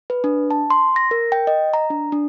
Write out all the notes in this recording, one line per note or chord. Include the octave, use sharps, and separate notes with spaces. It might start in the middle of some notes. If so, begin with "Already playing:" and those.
B4
D4
A5
C6
A#6
A#4
G5
D#5
A#5
D4
D4